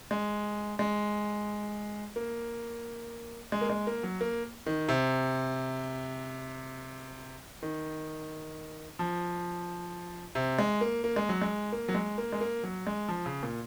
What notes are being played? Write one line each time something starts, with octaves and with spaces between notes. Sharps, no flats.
G#3
G#3
A#3
G#3
A#3
G#3
A#3
F#3
A#3
D#3
C3
D#3
F3
C3
G#3
A#3
A#3
G#3
F#3
G#3
A#3
F#3
G#3
A#3
G#3
A#3
F#3
G#3
F3
C#3
A#2